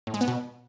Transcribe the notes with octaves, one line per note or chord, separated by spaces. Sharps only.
A2
G#3
B3
B2